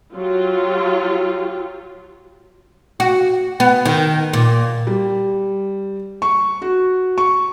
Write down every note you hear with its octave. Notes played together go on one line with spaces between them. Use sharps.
F#3 F4 G4
F#4
B3
D#3
A#2
G3
C#6
F#4
C#6